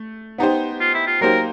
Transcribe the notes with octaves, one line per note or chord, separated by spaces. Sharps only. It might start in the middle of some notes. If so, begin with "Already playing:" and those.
Already playing: A3
B3 D#4 G4 C5
F4
E4
F4
F#3 A#3 D#4 G4 A#4 C5